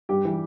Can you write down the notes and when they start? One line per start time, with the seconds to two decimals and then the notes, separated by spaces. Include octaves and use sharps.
0.09 G2 G4
0.25 E3 G3